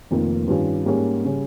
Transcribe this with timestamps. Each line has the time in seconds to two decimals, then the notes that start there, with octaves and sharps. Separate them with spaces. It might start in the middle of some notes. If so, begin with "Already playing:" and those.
0.11 F1 F2 D#3 A#3 D#4
0.48 G2 D#3 G3 C#4 F4
0.86 G#2 G3 A#3 C#4
1.25 C#3 G3 C#4